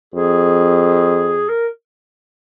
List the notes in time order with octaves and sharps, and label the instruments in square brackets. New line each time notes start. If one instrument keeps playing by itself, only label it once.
[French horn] F2 [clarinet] G#4
[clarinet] A#4